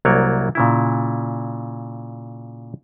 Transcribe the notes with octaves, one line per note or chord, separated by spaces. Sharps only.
C2 F#3 A#3 C#5 D5
A#2 C#3 E4